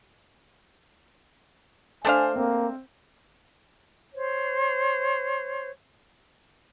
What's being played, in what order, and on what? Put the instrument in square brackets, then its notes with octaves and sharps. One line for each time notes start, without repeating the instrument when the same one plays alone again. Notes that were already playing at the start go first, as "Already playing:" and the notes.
[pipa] A3 D4 F5 [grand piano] C5 A5 [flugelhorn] G#5
[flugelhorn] A#3 [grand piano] C4
[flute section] C5 C#5